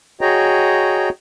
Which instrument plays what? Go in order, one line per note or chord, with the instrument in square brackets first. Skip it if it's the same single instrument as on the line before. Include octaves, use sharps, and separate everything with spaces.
[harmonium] F#4 G#4 C#5 D#5 G5 A#5